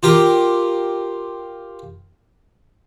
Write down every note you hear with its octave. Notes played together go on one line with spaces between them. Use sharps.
F4 G4 A#4